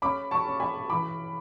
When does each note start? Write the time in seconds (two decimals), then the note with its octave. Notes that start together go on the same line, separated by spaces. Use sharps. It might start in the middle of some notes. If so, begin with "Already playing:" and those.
0.02 C#4 B5 D6
0.31 A5 C#6
0.45 C#4
0.60 G#5 B5
0.90 E3 B5 D6